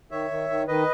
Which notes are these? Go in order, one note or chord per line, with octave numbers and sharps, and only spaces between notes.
D#3 C#5 E5
D#3
D#3
D#3 B4 D#5